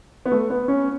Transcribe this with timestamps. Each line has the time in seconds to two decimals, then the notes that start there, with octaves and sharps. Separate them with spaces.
0.26 B3
0.32 A3
0.50 B3
0.68 C#4